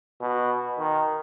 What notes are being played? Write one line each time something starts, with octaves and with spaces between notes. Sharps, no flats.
B2
D#3